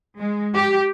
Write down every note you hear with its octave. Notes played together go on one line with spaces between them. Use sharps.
G#3
G4